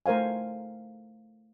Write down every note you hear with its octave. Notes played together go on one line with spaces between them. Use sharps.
A3 A#4 C5 F5 G#5